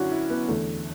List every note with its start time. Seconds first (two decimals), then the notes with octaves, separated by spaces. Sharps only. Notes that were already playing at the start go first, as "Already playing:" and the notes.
Already playing: F#2 D3 C#4 D4 E4 F#4
0.12 E4
0.30 B3
0.48 E2 D3 A3